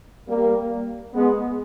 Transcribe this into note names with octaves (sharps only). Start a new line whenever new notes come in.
G3 A#3
G#3 B3